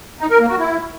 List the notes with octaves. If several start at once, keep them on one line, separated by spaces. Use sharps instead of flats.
D#4
A#4
A#3
F#4
E4